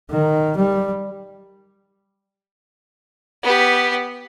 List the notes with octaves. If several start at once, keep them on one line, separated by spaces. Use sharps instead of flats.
D#3
G3
B3 G4